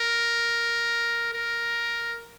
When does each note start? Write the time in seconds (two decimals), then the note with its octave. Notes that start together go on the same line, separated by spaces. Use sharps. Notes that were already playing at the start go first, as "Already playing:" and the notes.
Already playing: A#4
1.34 A#4